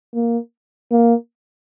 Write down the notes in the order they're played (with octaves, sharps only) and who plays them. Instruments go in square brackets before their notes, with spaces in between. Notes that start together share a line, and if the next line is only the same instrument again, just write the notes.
[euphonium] A#3
A#3